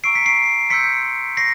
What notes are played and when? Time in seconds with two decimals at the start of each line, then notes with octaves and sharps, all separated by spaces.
0.04 A#5 C#6 E6 C7 D7
0.15 B6 C#7
0.26 C7 D7
0.70 C6 E6 G6 B6 C#7
1.37 C#6 A#6 C7